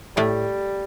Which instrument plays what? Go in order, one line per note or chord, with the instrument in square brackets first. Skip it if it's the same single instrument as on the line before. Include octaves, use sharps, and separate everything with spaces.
[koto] A2 A3 [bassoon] G3